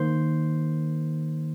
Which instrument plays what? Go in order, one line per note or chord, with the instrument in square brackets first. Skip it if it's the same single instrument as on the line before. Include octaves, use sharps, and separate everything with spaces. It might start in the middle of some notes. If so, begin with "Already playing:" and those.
Already playing: [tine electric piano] D#3 A#3 C5 C6